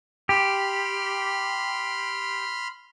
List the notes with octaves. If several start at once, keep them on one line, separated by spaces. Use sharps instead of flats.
G4 B5 C6 F6